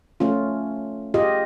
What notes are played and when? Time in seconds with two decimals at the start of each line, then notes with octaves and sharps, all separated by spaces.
0.20 A3 C#4 F4
1.14 F4 G4 G#4 D#5